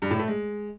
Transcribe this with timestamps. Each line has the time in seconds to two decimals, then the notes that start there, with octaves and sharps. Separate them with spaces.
0.02 G2
0.11 A2
0.19 A3
0.28 G#3